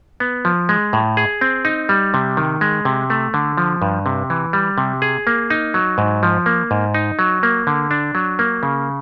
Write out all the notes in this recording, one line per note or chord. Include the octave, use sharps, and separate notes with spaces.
B3
F3
G#3
A2
G#4
C4
D#4
G3
C3
D#3
G#3
C3
A3
D3
F3
G2
C3
E3
G3
C3
G#4
A#3
D#4
F#3
G#2
F3
A#3
G#2
D#4
F#3
A#3
D3
D4
F#3
A#3
C#3